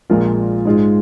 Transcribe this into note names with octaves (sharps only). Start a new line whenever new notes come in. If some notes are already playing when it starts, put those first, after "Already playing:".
A#1 A#2 G#3 F4 A#4
G#2 G#3 F4